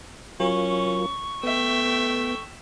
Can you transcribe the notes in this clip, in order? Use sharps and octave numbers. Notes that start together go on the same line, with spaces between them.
F#3 C#4 F4 A#4 C#6
A3 B3 E5 G5